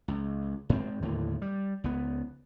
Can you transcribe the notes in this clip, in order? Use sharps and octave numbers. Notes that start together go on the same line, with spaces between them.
C#2
G#2 C4
D#2 A2 D3
G3
C#2 B3